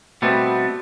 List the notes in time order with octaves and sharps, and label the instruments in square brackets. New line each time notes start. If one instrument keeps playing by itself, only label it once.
[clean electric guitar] B2 G3 A3 B3 C4